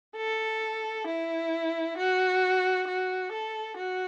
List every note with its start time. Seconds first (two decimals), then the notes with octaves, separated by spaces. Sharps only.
0.17 A4
1.07 E4
1.97 F#4
2.88 F#4
3.33 A4
3.77 F#4